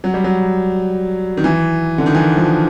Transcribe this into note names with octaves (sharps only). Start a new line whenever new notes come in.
F#3
G3
F#3
D#3
E3
D3
D#3
E3
F3